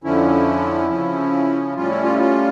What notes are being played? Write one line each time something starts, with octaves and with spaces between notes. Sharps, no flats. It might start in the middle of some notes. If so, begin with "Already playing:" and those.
F2 D3 F3 C#4 E4
C#3 F3 C#4
A2 G3 C#4 F4
E4
F4
E4
F4